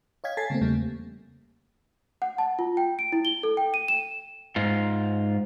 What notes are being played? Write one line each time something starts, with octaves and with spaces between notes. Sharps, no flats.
C#5 D#5 F5 G5 G#6 B6
A4 G#5 A5 A6 B6 C7
C#3 A3 A#3 C4
E2 C#3 G3 A3 A#3
F#5
A5
F4
G5
D7
E4
G7
A4
G5
D#7
E7
G#2 F4